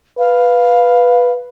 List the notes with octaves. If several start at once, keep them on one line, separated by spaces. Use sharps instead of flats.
B4 F5